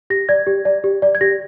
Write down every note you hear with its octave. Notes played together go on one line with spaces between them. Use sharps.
G4 A#6
D5 G#6
G4
D5
G4
D5
G#6
G4 A#6